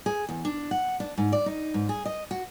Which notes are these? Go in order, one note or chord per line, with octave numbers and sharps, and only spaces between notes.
G#4
E2
D4
F#5
D4
G#2
D5
D#4
G#2
G#4
D#5
F#4